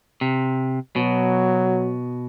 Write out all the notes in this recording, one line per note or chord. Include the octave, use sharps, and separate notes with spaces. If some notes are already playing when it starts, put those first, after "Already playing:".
C3
B2 F#3